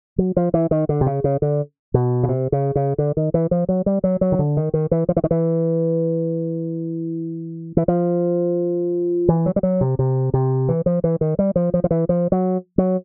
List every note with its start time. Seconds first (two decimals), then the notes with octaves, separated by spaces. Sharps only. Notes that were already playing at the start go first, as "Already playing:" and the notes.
0.18 F#3
0.37 F3
0.54 E3
0.71 D#3
0.89 D3
1.01 C3
1.06 C#3
1.24 C#3
1.42 D3
1.94 B2
2.23 C#3
2.29 C3
2.52 C#3
2.76 C#3
2.98 D3
3.17 D#3
3.34 E3
3.51 F3
3.69 F#3
3.86 G3
4.04 F#3
4.21 F#3
4.32 D#3
4.39 D3
4.57 D#3
4.74 D#3
4.91 E3
5.09 F3
5.17 E3
5.24 D#3
5.31 E3
7.77 E3
7.88 F3
9.29 E3
9.46 F#3
9.56 G3
9.63 F#3
9.81 C3
9.99 C3
10.34 C3
10.69 E3
10.86 F3
11.04 E3
11.21 D#3
11.39 G3
11.56 F3
11.74 F3
11.84 F3
11.91 E3
12.09 F3
12.32 F#3
12.78 F#3